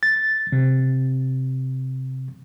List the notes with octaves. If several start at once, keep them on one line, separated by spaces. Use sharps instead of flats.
A6
C3